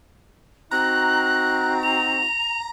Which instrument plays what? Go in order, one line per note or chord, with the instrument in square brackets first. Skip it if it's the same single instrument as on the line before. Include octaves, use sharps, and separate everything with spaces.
[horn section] C4 D#4 F#4 [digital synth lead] A#5 [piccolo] F#6
[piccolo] F7